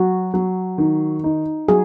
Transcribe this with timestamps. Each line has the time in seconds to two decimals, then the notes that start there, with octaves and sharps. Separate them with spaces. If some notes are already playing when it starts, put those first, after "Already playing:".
Already playing: F#3 F#4
0.34 F#3
0.78 D#3
1.24 D#4
1.68 F#3 G#4